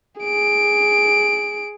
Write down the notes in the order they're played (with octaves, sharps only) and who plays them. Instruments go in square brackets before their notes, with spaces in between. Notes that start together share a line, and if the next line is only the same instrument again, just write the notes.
[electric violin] G#4 D7